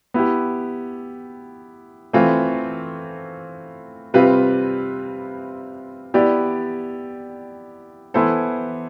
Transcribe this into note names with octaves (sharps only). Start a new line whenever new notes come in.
B3 E4 G4
E3 A3 C4 F4
C3 G3 C4 F4 B4
B3 E4 G4 D5
E3 B3 E4 A4 C5